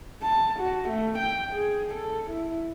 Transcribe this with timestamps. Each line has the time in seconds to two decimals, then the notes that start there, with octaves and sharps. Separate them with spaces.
0.22 A5
0.60 F#4
0.89 A3
1.19 G5
1.54 G#4
1.94 A4
2.31 E4